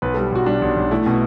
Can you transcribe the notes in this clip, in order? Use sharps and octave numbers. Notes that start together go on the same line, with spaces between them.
B1 B4
G3 A4
B1 F#4
G3 D4
B1
B1
A3 E4
B2